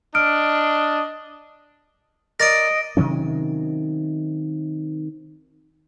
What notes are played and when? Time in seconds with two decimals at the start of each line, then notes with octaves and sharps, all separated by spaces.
0.15 D4 D#5 F6 D7
2.40 A#4 D5 D#5 A#6 D7
2.97 C3 D#3 F#3 C#4